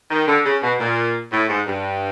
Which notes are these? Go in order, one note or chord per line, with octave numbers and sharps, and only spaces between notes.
D#3
D3
C#3
B2
A#2
A2
G#2
G2